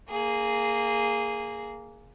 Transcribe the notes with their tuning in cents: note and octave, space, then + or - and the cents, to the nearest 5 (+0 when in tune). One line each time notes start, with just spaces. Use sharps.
A#3 -10 G#4 +0